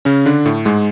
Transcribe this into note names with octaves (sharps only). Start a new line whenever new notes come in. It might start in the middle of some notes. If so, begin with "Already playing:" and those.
C#3 C#4
D3 D4
A2 A3
G#2 G#3